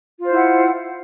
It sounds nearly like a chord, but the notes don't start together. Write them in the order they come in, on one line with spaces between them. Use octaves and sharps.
F4 C5 E4 F#5